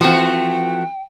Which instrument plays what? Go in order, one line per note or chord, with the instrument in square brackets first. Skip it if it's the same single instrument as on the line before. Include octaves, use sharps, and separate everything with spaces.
[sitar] E3 A3 F#4 [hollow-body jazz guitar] F3 C4 [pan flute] G5